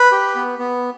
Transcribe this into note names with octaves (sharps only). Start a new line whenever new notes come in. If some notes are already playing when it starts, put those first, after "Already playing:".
Already playing: B4
G4
B3
B3